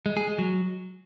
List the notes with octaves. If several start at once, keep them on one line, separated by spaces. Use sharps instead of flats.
G#3
G#4
G#3
F#3